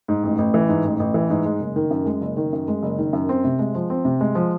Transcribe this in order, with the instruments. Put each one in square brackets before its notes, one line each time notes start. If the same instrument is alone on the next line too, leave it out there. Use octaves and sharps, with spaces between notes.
[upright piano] G#2
A1
A1
E3
G#2
A1
A1
E3
G#2
G#3
F#1
D#3
F#2
G#3
F#1
D#3
F#2
G#3
F#1
D#3
F#2
C4
C3
G#3
F3
C4
C3
G#3
F3